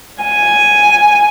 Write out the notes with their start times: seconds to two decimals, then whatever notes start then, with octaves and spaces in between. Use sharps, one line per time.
0.22 G#5